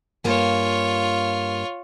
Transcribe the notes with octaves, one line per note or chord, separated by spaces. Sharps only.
G2 A#3 F4 C#5 G#5